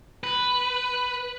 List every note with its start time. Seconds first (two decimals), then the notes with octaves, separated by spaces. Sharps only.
0.24 B4